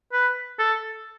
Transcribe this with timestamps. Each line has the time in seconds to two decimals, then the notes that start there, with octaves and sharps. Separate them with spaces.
0.13 B4
0.59 A4